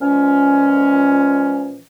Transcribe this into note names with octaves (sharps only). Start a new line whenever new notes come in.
A#2 E3 F3 G#3 C#4